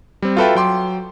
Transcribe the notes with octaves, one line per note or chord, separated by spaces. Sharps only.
G3 C4
F4 F#4 A4 B4 E5 G5
F#3 G5 C6 D6